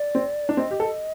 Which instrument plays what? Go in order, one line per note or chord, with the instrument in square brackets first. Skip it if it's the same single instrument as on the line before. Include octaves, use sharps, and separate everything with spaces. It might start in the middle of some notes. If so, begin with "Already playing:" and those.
Already playing: [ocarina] D5
[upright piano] C4
D4
[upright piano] C4 [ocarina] D#5
[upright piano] G4
A4